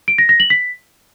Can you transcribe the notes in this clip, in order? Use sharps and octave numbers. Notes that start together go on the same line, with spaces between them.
D7
A#6
A#6
F#7
B6